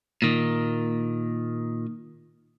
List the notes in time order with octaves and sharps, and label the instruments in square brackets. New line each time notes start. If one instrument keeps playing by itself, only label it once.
[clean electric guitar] A#2 D#3